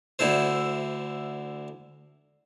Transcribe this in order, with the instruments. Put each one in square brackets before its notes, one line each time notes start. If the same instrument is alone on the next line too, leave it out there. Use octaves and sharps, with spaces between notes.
[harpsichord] D2 D3 E4 A4 C5